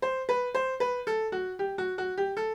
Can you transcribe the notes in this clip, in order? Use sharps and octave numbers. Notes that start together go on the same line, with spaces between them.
C5
B4
C5
B4
A4
F#4
G4
F#4
F#4
G4
A4